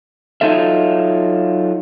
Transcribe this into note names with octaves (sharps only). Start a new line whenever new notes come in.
F#3 D#4 F4 A4 E5